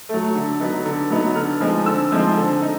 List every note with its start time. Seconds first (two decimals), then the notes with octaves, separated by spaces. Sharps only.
0.09 F#3 A3
0.35 D3
0.60 F#3 B3 D#4
0.85 D3
1.10 F#3 B3 D#4
1.36 D3 F6
1.60 F3 G#3 C4 D#4
1.86 D3 E6
2.12 F3 G#3 C4 D#4
2.37 D3
2.62 D#4